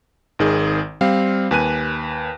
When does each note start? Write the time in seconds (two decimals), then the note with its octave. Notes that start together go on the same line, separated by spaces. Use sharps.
0.39 G#1 D#3 G#4
1.01 G3 C4 F5
1.51 D#2 B4 G#5 F#6 D#7